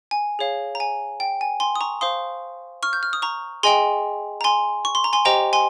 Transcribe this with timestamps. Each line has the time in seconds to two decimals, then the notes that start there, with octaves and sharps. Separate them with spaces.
0.11 G#5
0.39 G#4 C#5 F5
0.75 A#5
0.80 G#5
1.20 G5
1.41 G#5
1.60 G#5 C6
1.76 D#6
1.81 A#5 C#6
2.01 C5 F5 C6 D#6
2.83 C#6 F6
2.93 G6
3.03 F6
3.13 D#6
3.22 A#5 C#6
3.63 G#4 D#5 G5 G#5 C6
4.41 A#5
4.44 G#5 C6
4.85 C#6
4.95 C6
5.04 A#5
5.13 G#5 C6
5.25 G4 C5 D#5 G5 A#5
5.53 G#5 C6